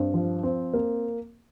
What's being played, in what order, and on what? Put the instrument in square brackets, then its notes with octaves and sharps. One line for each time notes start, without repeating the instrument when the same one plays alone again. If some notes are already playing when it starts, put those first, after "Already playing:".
Already playing: [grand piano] G2 [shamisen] C4
[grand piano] F3
C4
A#3